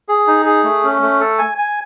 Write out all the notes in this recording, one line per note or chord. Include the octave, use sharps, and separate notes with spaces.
G#4
D#4
G#4
A3
C#4
A3
A4
G#5
G#5